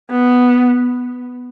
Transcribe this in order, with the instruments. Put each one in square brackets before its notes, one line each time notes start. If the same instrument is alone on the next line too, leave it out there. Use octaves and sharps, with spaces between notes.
[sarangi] B3